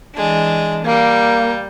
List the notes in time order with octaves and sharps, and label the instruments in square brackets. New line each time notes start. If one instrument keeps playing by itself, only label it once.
[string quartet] E3 G#3 D4
[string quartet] G3 [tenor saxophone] A#3